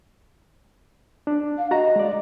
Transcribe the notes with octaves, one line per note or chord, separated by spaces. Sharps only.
D4
F5
F#4 D#5 A#5
G#3 D5